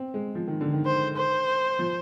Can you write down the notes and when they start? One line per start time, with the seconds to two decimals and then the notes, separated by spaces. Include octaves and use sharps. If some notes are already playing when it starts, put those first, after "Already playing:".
Already playing: C4
0.14 G#3
0.35 F3
0.48 D#3
0.61 D3
0.73 D#3
0.86 C5
1.17 C5
1.79 F3